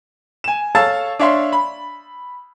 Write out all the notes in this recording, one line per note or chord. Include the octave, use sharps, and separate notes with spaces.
G#5 E7
A4 C#5 F5 A5 E6 A6
D4 C#5 E5 F5 C6 C#6
B5